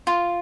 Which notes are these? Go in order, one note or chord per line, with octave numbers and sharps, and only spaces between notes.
F4